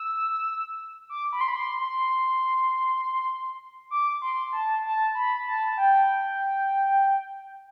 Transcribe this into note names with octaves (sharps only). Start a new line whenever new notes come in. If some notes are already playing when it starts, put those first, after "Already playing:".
Already playing: E6
D6
B5
C6
B5
C6
C6
D6
C6
A5
A5
B5
A5
G5